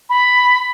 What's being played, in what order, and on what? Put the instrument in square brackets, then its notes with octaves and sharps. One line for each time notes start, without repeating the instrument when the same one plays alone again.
[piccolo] B5